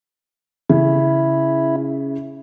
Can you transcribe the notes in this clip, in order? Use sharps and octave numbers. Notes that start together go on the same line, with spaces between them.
C#3 E4